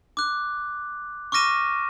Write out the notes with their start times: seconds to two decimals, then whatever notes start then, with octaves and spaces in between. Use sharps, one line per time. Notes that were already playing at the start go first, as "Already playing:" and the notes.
0.17 D6 F#6
1.32 C#6 D6 F6 A#6 D#7 E7